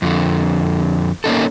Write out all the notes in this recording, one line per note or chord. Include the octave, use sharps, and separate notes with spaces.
F2 D3
A#3 C#4 D#4 A4